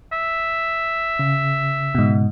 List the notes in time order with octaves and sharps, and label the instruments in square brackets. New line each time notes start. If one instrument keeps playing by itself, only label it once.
[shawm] E5
[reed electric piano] C#3
[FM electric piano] G#2 B2